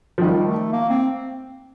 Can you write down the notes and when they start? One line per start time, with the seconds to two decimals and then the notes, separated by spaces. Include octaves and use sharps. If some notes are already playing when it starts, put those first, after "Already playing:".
0.18 F3
0.22 D#3 G3
0.47 A3
0.72 A#3
0.89 C4